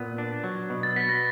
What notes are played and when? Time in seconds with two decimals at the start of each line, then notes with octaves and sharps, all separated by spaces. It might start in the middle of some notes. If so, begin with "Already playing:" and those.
Already playing: A#2 B3
0.18 D4
0.44 F#3
0.70 B2
0.83 A6
0.96 B3 B6
1.09 A#6